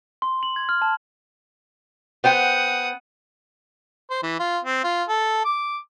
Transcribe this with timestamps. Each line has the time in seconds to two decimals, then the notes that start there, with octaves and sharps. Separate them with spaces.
0.22 C6
0.43 F#7
0.56 G#6
0.69 F6
0.82 A5
2.24 B3 C5 F#5 G5 D#6
4.10 C5
4.23 E3
4.39 F4
4.64 C4
4.84 F4
5.09 A4
5.45 D6